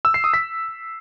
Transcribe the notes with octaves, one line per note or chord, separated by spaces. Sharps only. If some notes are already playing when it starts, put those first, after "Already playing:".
E6
C7
D#6
B6